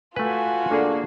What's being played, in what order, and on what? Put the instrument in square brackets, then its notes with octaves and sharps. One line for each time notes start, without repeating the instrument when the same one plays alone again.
[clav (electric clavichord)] A3 B4 [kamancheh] F4 F#4 [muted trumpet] G#5
[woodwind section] D3 [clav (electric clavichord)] A#3 G#4